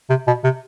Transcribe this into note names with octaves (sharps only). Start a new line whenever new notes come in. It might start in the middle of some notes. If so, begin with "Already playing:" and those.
C3
B2
C3